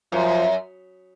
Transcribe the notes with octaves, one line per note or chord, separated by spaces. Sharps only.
F#2 F3